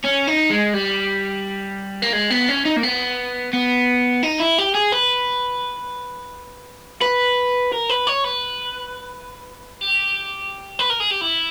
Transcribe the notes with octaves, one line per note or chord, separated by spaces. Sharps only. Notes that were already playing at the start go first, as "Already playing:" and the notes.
C#4
D#4
G#3
G3
A#3
G#3
B3
C#4
D#4
A#3
B3
B3
D#4
E4
G4
G#4
B4
B4
A#4
B4
C#5
B4
G4
B4
A#4
G#4
G4
E4